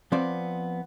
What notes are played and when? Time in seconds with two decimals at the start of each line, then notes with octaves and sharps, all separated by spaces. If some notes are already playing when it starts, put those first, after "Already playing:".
0.12 F3 B3 C4 D5